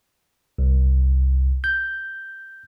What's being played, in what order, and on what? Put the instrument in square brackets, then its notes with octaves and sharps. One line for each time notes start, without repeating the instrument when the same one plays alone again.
[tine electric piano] C2
G6